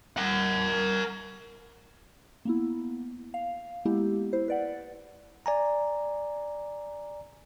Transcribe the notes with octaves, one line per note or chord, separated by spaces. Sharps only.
A#4 F#5
A#3 B3 E4
F5
G#3 A#3 B3 E4 G4
E4 C5
B4 D5 F#5
D5 G#5 A#5